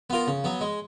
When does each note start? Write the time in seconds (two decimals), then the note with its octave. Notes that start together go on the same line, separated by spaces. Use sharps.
0.10 B3 F4 A#4
0.27 C#3
0.44 F#3 B3
0.61 G#3